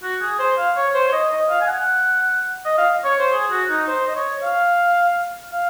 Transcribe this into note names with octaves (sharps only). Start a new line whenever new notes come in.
F#4
G#4
C5
F5
C#5
C5
C#5
D#5
D#5
F5
G#5
F#5
D#5
F5
C#5
C5
G#4
F#4
D#4
C5
D#5
C#5
F5
F5